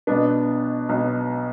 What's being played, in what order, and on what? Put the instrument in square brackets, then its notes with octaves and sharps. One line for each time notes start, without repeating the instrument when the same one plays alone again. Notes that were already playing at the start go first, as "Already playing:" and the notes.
[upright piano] B1 B2 B3 D4
B1 B2